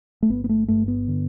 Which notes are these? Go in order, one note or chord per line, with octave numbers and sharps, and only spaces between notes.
A3
G1 B3
B3
A3
G2 A3
B3
D3